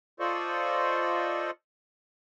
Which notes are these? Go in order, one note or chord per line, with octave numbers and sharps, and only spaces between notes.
F4 A4 C5 D5 D#5 C#6